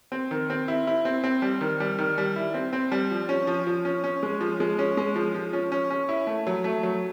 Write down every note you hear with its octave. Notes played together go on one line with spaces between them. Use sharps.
C4
D#3
C4
E4
E4
C4
C4
G3
D#3
G3
D#3
G3
E4
C4
C4
G3
F3
C#4
F3
F3
C#4
C#4
G#3
F3
G#3
C#4
G#3
F3
F3
C#4
C#4
C#4
E4
A3
F#3
A3
F#3